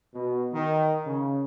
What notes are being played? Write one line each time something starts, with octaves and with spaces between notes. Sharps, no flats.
B2
D#3
C#3